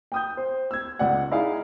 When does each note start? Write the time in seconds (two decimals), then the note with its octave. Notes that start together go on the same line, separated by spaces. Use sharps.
0.12 G5 D#6 G6
0.37 C5
0.71 E6 G#6
0.99 C#2 D5 F#5
1.31 D#4 E4 G#4 D5 F5